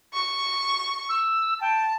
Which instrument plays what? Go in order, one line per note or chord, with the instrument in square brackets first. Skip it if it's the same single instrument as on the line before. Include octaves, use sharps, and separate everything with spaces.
[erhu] C#6
[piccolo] E6
[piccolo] G5 [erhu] A5